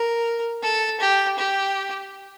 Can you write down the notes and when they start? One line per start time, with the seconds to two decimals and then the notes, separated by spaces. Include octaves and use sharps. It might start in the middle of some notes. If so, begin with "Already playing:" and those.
Already playing: A#4
0.63 A4
1.01 G4
1.39 G4